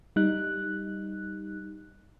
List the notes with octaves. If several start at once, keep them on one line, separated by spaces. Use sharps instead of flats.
G3 D#4 F#6